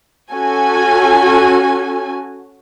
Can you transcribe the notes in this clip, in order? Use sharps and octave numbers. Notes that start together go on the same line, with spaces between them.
C#4 F#4 A4 G#5